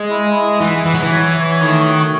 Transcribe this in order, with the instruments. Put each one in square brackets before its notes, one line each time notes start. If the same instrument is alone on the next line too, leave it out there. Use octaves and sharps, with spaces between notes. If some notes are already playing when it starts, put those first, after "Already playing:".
Already playing: [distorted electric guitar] G#3
[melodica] E4
E4
[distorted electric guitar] E3 [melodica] F#5
[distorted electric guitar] E3 [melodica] F#5
[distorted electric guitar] F#3
E3
[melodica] C#5
C#5
[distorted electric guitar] D#3 [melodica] A3
[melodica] F#4